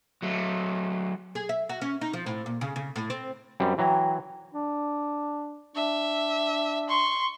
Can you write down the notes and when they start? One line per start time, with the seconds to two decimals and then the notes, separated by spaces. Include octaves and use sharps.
0.22 F#3 A3
1.35 G#4
1.49 E5
1.69 F#4
1.81 C#4
2.01 D#4
2.13 F3
2.26 A2
2.46 A#2
2.61 C#3
2.76 C#3
2.96 A2
3.10 C4
3.60 F#2 G3 C4
3.78 E3 F#3 G5 A#5
4.54 D4
5.76 D4 E5
6.89 C6 C#6